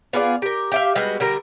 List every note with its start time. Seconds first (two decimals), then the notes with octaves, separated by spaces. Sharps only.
0.13 B3 F4 G#4 D5
0.42 G4 A#4
0.72 G4 E5 F5
0.95 G3 G#3 B3 F#4
1.20 D3 G3 A#4